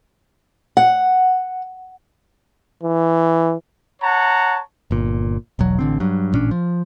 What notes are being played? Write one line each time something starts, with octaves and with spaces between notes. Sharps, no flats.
F#5
E3
C#5 F#5 A5 A#5
G1 A#2
E1 B1 F#3
A1 D3 C4
G2 F#3
A1 A#2 C#4 D4
F3